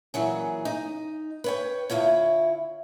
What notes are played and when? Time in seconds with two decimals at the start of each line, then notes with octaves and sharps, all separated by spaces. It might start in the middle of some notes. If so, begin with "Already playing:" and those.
0.14 A#2 E3 F#3 G#4
0.65 D#4
1.44 B4 C#5 G5
1.90 D2 D#3 E4 F4 C#5